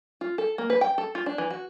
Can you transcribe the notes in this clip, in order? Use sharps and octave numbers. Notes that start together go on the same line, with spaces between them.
F4
A4
A#3
B4
G5
A4
F4
D4
E3
F#4